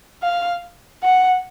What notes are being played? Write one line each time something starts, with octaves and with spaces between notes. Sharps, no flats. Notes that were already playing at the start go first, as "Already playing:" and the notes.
F5
F#5